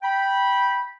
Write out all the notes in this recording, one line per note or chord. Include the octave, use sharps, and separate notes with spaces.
G5 B5